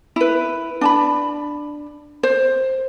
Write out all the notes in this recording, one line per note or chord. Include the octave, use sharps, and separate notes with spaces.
E4 B4
D4 A5 B5
C5